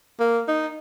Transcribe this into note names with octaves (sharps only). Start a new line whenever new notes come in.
A#3
D#4